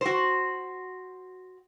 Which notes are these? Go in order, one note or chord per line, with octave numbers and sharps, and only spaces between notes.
F#4 C5